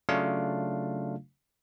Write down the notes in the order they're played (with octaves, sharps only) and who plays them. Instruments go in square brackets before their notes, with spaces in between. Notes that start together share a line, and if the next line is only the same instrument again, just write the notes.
[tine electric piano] C#3 F#3 A3 D4 F4 F5